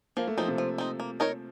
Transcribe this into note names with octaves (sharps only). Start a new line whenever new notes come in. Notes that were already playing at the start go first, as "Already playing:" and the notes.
F3 A#3
A3
F3 C4 D#4
C3
F3
C4 D#4
A#3
D#4 A#4 C#5